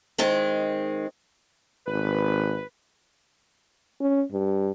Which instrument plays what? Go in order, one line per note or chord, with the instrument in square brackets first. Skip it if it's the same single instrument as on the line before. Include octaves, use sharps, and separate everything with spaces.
[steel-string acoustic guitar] D#3 G#3 C4
[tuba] G#1 [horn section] B4
[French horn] C#4
G2